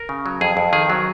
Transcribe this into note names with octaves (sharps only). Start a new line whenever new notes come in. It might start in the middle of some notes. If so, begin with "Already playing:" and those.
Already playing: A#4
C#3
F#3
F2 G#4
F2
D#3 G#4
F#3